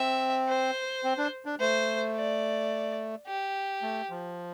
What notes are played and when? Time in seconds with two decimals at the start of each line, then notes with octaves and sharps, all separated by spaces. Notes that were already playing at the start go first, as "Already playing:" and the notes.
Already playing: C4 E5
0.48 C5
1.04 C4
1.18 D4
1.46 D4
1.60 A3 C5
2.16 D5
3.26 G4
3.82 A3
4.10 F3